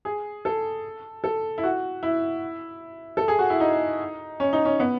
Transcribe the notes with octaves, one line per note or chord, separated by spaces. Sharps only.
G#4
A4
A4
E4
F#4
E4
A4
G#4
F#4
E4
D#4
C#4
D#4
C#4
B3